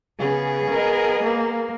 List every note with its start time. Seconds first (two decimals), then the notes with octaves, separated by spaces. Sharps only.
0.19 C#3 B3 G#4
0.71 A#4 D#5
1.23 A#3